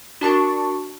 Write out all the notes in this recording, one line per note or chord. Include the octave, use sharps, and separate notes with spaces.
D4 F#4 A#4 A5 C#6 A6